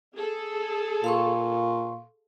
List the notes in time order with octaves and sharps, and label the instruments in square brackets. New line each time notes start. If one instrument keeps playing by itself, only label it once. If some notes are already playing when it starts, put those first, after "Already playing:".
[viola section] G#4 A4
[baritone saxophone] A#2 [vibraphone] F5 C6 C#6